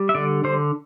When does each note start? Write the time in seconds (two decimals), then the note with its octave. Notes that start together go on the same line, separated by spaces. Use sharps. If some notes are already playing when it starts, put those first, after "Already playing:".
Already playing: G3
0.09 E5
0.15 D3 D5
0.44 D3 C5